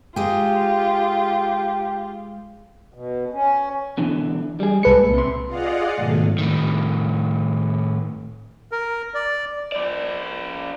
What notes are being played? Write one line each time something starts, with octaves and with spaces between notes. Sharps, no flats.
G#3 F4 G4 G#4
B2
C#4
B2 D3 E3
G3 G#4
C2 G#3 G#4 A4 B4 C#7
A#2
C3 C6
F4 G#4 D5 D#5 F5 F#5
G#2 B2 D#3 F#3 A3
A2 D#3
A#4
D5
F3 D5